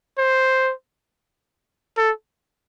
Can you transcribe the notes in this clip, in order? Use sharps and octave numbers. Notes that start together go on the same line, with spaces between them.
C5
A4